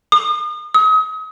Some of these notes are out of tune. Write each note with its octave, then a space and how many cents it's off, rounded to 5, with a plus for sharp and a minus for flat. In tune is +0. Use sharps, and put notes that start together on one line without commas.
D#6 -35
D#6 +35